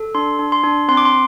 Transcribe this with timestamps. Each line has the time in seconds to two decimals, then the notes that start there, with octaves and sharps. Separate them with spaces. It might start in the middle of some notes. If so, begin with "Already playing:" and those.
Already playing: A4
0.15 D4 C6
0.39 D4
0.52 C6
0.64 D4
0.88 C4 C6
0.97 D6
1.05 C6